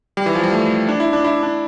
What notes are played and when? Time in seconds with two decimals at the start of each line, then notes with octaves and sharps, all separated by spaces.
0.17 G3
0.26 E3
0.35 F3
0.43 G3
0.53 A3
0.89 D4
1.00 E4
1.13 D4
1.24 E4
1.43 D4